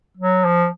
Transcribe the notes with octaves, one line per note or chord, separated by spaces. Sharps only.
F#3
F3